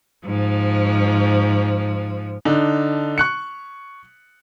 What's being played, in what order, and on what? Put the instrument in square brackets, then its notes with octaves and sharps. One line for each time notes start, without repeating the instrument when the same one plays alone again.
[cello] G#2 F3
[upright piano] D3 D4 D#4
C#6 F#6 C#7